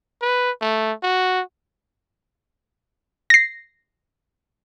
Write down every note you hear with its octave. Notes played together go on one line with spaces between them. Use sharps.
B4
A3
F#4
A#6 C7